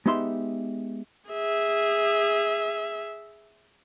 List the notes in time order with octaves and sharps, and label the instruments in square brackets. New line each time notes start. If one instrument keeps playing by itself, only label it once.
[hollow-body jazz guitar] G#3 B3 D#4 G4 E5 C6
[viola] G#4 E5